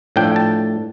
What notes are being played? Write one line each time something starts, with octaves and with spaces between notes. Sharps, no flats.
A2 F3 D4 G5
A5